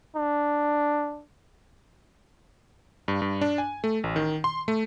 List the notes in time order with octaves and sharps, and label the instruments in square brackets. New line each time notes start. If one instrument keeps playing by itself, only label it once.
[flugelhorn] D4
[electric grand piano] G2
G2
D4
G#5
A3
A1
D#3
C6
A3